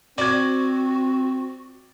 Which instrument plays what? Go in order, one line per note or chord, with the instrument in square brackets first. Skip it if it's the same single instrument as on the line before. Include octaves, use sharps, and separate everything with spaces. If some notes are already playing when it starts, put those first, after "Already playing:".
[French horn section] C4 [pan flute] F#4 [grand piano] D5 G#6